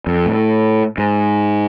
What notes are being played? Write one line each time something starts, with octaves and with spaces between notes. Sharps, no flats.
F2
A2
G#2